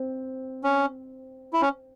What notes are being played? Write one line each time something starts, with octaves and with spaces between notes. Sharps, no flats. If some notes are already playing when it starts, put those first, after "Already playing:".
Already playing: C4
C#4
E4
C#4